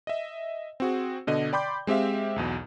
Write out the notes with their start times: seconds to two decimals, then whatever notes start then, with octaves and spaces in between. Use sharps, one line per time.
0.07 D#5 E5
0.80 C4 F#4 G#4
1.27 B2 D3 D#5
1.53 D5 G5 B5 C6 D6 G6
1.87 G#3 C4 G4 E5 F5
2.36 B1 E2 B2